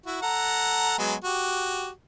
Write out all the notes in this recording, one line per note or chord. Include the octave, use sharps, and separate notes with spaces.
E4 F#4
A4 F#5 A#5
F#3 G#3 B3
F#4 G4